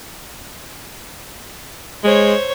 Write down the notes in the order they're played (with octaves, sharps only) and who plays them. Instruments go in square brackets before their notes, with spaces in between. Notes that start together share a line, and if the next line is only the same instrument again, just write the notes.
[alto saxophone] G#3 [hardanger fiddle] C5 C#5